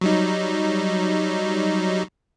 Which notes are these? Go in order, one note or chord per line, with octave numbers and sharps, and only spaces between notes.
F#3 G3 D#4